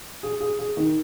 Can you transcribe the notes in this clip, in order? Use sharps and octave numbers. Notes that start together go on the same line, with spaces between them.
G#4
G#4
G#4
D#3